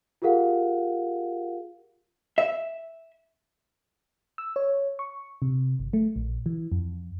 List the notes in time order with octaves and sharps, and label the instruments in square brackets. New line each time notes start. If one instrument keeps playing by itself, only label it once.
[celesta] F4 G4 G#4 A#4 F5 F#5
[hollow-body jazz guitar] E5
[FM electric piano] E6
C#5
C#6
C3
G1
A3
A#1
E3
F2